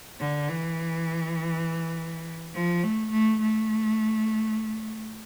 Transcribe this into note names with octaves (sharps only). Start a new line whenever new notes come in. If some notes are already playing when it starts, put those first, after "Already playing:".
D3
E3
F3
A3
A3
A3